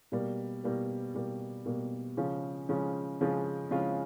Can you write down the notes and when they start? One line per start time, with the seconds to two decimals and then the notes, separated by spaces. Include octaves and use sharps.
0.12 B2 G3 A#3
0.64 B2 G3 A#3
1.15 B2 G3 A#3
1.66 B2 G3 A#3
2.17 C#3 F3 G#3 C#4 F4
2.69 C#3 F3 G#3 C#4 F4
3.21 C#3 F3 G#3 C#4 F4
3.71 C#3 F3 G#3 C#4 F4